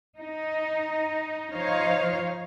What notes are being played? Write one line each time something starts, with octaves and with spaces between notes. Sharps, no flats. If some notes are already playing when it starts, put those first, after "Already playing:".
D#4
F3 D#4 C5 C#5 F5